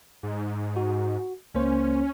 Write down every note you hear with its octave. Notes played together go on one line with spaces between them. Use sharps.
G#2
F#4
C#2 A#3 C#4 C5